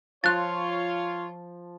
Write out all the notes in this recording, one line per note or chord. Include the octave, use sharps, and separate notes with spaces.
F3 F4 C#5 F#6 A6